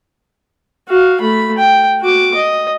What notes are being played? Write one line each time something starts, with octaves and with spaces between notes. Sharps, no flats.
F#4 F5
A3 B5
G5
F#4 D6
D#5